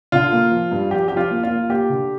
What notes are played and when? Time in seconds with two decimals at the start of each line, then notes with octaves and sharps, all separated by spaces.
0.12 D3 F4
0.32 A#3
0.51 F3
0.71 G2
0.91 F3 G4
1.08 F3 G4
1.17 F4
1.31 A#3
1.43 F4
1.50 A#3
1.69 A#3 G4
1.89 D3